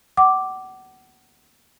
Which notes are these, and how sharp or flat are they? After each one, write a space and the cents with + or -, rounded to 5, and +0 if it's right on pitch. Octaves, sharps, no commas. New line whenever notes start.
F#5 +30 D6 +0